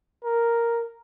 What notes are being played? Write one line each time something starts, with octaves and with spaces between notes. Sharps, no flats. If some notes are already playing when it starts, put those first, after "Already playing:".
A#4